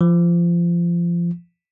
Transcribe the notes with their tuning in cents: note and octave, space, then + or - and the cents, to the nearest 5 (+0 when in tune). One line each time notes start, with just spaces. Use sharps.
F3 -25